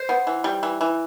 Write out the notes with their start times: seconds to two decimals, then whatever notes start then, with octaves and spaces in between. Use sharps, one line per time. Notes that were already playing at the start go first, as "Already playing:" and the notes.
Already playing: C5
0.09 B3
0.27 E3
0.44 G3
0.63 E3
0.81 E3